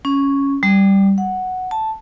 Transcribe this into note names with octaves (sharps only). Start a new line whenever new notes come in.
C#4
G3
F#5
A5